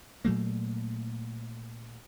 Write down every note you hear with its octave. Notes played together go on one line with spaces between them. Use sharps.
A#2 F#3 A3 A#3